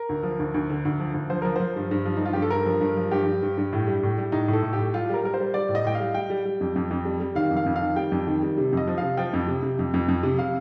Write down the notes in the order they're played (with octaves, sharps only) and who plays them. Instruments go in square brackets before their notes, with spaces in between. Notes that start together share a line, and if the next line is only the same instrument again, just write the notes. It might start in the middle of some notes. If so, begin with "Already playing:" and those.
Already playing: [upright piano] A#4
D2
F3
D2
D2
D3
D2
F3
D2
F3 C5
F3 A#4
F3 C5
G2
G2
F3
D#4
G2 F4
G2 G4
A4
G2 A#4
F3
G2
F3
G2 G4
G2
G2
G2
A2
G3
A2
G3
A2 D#4
A2
A4
A2
G4
A2
G3 F4
G3 A#4
G3 A#4
C5
G3
G3 D5
A2
D#5
A2 G5
G3 F5
G3 G5
G3
G3
F2
F2
F2
G3
G3
D#3 F5
F2
F5
F2
F5
D#3
G3 G5
F2
D#3
G3
C3
F2 D#5
F3
C3 F5
F3 G5
F2
C3
C3
F2
F2
F2
C3
C3 F5